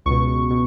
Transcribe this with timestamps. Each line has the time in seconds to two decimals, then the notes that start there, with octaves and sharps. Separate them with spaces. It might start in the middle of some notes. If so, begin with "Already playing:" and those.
0.06 C#2 B2 C#6
0.50 B2